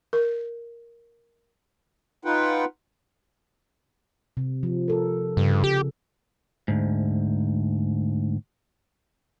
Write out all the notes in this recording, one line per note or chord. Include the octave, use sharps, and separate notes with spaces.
A#4
D#4 F4 B4 F#5 G5
C3
F3
A4 A#4
G2 C#3
G4
D2 G#2